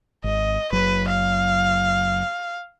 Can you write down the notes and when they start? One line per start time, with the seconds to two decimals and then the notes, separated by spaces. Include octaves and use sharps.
0.24 G#1 D#5
0.72 F#1 F#3 B4
1.08 F5